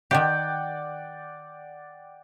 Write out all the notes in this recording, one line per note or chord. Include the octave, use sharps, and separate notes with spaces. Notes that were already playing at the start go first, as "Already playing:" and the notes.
D#3 G4 D5 F#5 G5